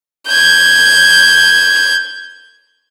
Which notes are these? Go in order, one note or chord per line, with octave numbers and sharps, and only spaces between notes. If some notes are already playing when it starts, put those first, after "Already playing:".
G6 G#6